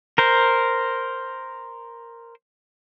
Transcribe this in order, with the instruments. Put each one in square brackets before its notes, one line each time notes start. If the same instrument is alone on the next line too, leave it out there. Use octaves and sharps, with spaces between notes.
[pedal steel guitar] A#4 C5